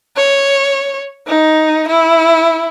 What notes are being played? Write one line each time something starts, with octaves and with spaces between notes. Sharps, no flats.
C#5
D#4
E4